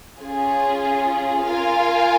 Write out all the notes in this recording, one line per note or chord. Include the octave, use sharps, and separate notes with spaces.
C#4 F4 G#4
F4 A#4 F5 G#5